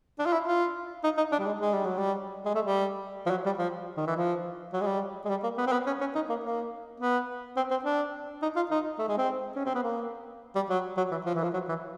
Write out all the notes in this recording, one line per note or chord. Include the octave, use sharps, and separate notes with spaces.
D4
F4
E4
F4
D#4
D#4
D4
G3
G#3
G#3
G3
F#3
G3
G#3
A3
G3
F3
F#3
G3
F3
D#3
E3
F3
F#3
G#3
G3
G#3
G3
A#3
B3
C4
B3
C#4
C#4
D#4
A#3
A#3
B3
C4
C4
D4
D#4
F4
D#4
A3
G#3
C4
C#4
C4
B3
A#3
G3
F#3
F#3
E3
F3
E3
F3
F#3
E3